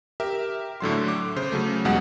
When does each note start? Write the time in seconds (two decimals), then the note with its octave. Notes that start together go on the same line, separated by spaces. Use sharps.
0.20 G4 A#4 E5
0.80 A2 D3 F#3 C6
1.08 D6
1.36 C#3 C5
1.52 C#3 F#3 A3
1.85 E2 B2 G3 G#3 F#5